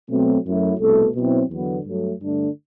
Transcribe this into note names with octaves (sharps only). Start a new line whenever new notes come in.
B2 F#3 A3 C4
F#2 F#3 A3 E4
C2 B2 A3
B2 F#3 C4 E4
E2 D3 F#3 B3
G2 F#3 A3
G2 D3 A3 D4